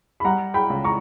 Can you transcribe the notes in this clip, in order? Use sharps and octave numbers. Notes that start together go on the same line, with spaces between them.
B5
G3 F#5 A#5
G5 B5
C#2
A#5 C#6